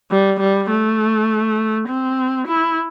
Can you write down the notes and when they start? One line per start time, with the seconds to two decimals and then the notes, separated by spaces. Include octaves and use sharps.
0.11 G3
0.40 G3
0.71 A3
1.88 C4
2.48 E4